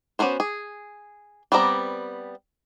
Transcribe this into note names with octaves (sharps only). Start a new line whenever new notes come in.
B3 C#4 F#4 A#4 C5
G#4
G3 B3 C4 D5 A#5